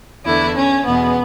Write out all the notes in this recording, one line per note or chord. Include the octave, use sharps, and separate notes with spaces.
E2 D3 A3 E4
C#4
E2 B2 G#3 B3